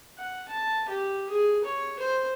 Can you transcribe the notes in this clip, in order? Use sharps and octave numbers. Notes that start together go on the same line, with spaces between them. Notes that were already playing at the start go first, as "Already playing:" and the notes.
F#5
A5
G4
G#4
C#5
C5